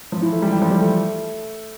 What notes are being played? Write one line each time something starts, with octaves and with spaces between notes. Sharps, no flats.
F3
E3
A3
G3
E3
F3
G3
A3